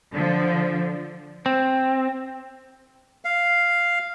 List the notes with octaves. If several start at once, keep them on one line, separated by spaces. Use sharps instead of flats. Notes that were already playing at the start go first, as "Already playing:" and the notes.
D3 F3
C4
F5